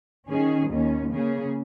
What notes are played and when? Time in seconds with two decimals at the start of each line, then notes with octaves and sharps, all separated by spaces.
0.29 D#3 C#4 G#4
0.69 D#2 D#3 C#4
1.11 C#3 A#3 C#4 G#4